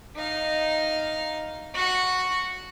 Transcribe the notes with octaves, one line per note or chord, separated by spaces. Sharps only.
D#4 F5
F#4 F#5